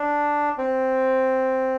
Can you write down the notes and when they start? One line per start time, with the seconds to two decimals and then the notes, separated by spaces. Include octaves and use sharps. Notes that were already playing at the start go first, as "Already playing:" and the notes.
Already playing: D4
0.58 C4